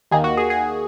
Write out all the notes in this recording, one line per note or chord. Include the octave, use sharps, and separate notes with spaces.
D#2 D#3 A#3 G#4
F#4
G#4
G#4